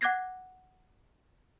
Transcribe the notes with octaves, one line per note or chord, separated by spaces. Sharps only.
F#5 D6 F#6 G#6 A#6 C7